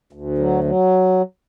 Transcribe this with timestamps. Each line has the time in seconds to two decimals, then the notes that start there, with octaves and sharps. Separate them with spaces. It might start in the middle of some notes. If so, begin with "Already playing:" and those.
0.13 D2
0.38 F#3
0.64 F#3